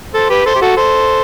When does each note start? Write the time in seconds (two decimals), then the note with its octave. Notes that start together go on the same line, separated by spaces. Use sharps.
0.14 A4 C5
0.30 G4 B4
0.46 A4 C5
0.55 G4
0.61 F#4 A4
0.77 A4 C5